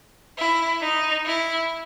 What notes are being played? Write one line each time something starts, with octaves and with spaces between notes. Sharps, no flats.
E4
D#4
E4